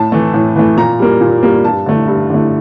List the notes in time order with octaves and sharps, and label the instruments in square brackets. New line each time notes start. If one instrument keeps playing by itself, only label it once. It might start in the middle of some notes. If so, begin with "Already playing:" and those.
Already playing: [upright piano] A2 A5
E3 A3
A2
E3 A3
A#2 A#5
G3 A#3
A#2
G3 A#3
G2 A5
D3 A3
G2
D3 A3